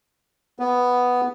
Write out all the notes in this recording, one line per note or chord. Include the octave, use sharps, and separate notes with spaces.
B3